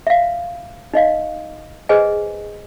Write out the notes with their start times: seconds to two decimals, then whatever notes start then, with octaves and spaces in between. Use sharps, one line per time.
0.07 E5 F5
0.94 D#4 D#5 F5
1.89 G#4 B4 C5 D#5 G#5